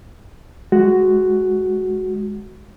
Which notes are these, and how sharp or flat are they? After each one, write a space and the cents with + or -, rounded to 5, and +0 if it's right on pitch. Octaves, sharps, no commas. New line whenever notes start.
G#3 +0 F#4 +5